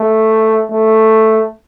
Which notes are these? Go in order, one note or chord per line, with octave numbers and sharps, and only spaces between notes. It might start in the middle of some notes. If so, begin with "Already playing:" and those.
Already playing: A3
A3